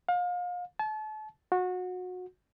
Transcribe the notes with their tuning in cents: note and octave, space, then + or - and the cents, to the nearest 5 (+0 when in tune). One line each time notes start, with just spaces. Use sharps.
F5 +35
A5 -35
F#4 -25